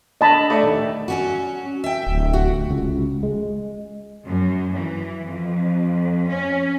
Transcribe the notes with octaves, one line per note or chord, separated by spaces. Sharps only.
D3 D#5 A5 B5
A3 D5 E5
D#2
F#3 C#4 F#4
E5 G5
D1
F#4
C#2
G#3
F#2
E3
F2
C#4